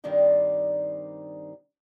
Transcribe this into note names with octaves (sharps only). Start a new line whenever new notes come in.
G2 D#3 G3 C4 D4 D#4